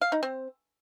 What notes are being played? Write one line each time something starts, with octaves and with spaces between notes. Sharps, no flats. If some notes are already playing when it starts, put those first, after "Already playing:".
F5
D#4
C4